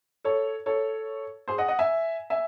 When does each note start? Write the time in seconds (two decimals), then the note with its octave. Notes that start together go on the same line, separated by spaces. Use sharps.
0.25 A4 C#5
0.66 A4 C#5
1.48 G#4 C5
1.58 D#5 F#5
1.68 D#5 F#5
1.79 E5 G#5
2.30 E5 G#5